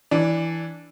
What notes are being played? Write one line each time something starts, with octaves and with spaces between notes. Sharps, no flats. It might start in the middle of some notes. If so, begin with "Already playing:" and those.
E3 D4